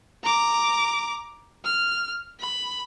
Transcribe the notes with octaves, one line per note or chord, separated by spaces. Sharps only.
A#5 D6
F6
B5